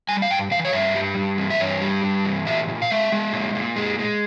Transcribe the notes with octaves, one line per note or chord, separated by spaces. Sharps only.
G3 G#5
F5
G2 G5
E3 F5
C#5
G2 E5
G3
G2
E3
E5
G2 C#5
G3
G2
E3
A#2 E5
A#2
F5
G#3 E5
G#3
A#2
A#2
G#3
G#3